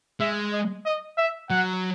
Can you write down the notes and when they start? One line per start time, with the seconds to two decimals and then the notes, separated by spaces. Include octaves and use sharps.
0.20 G#3 E5
0.52 D#5
0.86 D#5
1.18 E5
1.50 F#3 F#5